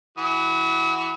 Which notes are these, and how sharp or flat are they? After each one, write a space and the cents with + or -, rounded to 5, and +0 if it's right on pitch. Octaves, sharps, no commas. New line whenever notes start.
E3 +0 F#4 +10 E6 -45